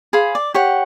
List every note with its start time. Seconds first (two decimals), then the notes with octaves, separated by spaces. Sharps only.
0.13 G#4 C5 F5 B5
0.35 D5
0.54 G4 C#5 F#5